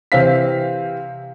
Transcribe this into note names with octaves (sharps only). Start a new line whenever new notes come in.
C3 E3 C4 F5 B6